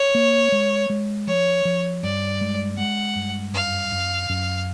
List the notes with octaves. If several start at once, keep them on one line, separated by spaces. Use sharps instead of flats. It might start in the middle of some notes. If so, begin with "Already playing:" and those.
Already playing: C#5
A#3
G#3
G#3
F3 C#5
F3
G2 D5
G#3
G#3 F#5
G2
F#2 F5
F#2
F#2